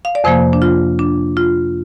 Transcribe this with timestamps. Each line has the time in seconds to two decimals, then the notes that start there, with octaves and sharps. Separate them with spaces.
0.05 F5
0.15 D5
0.24 F2 C3 F3 A#3 C5
0.53 D4
0.62 F4
0.99 D4
1.37 F4